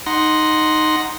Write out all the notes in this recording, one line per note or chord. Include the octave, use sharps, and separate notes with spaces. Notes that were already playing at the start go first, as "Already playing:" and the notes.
D#4 F#5 C6 A#6